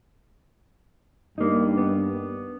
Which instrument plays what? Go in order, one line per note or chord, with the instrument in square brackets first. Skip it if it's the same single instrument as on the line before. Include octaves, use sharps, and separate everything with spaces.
[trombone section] G2 [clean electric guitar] A#3 D#4
[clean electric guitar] B3